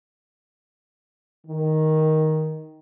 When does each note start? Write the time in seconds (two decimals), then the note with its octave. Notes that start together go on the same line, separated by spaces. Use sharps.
1.46 D#3